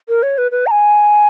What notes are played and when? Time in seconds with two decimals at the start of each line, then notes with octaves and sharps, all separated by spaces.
0.09 A#4
0.23 C#5
0.38 B4
0.51 B4
0.67 A#5
0.71 G#5